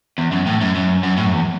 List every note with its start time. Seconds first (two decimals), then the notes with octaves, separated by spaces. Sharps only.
0.18 E2
0.32 F#2
0.46 A2
0.61 F#2
0.75 F#2
1.03 F#2
1.17 A2
1.25 F#2
1.33 E2